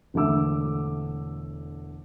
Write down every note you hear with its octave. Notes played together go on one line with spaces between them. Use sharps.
E1 D3 A3 E5 D6 E6